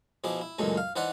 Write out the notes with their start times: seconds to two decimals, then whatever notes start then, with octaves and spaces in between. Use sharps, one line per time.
0.24 B2 F3 E4 G#4 D6
0.41 E4
0.59 C#2 F#2 A#2 E3 G#3 A3
0.77 F5
0.96 E3 D#4 C5 D5 E5 F#5